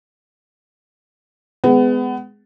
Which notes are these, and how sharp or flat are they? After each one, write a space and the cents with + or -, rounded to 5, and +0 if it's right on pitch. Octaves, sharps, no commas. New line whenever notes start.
G#3 +0 B3 +25